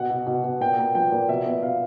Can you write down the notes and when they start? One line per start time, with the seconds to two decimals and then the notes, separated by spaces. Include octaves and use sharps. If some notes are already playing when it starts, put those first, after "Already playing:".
Already playing: B2 F#5
0.10 B2
0.27 B2
0.44 B2
0.61 A#2 G5
0.78 A#3
0.95 F3 G5
1.12 A#2
1.29 B2 E5
1.46 B3
1.63 B2 F5